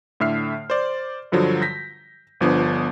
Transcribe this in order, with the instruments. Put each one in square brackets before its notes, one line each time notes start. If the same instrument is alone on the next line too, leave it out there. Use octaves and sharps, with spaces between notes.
[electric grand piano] A2 D3 E5 F6 C7
C5 D5
G2 D3 F3 F#3
G6 A#6 B6
G1 F3 B3 D4